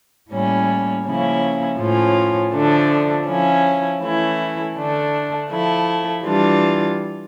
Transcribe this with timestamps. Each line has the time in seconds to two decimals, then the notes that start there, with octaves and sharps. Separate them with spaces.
0.31 A2 G3 A#3 C#4 E4
1.05 C#3 F3 A#3 C#4 E4
1.79 A2 F3 C#4 F4
2.53 D3 F3 A3 D4
3.27 F3 C#4 E4
4.02 E3 A3 C#4 E4
4.76 D3 A3 D4
5.50 F3 A3 E4
6.24 E3 G3 D4 F4